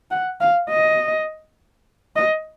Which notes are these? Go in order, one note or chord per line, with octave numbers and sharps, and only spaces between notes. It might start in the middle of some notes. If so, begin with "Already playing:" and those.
F#5
F5
D#5
D#5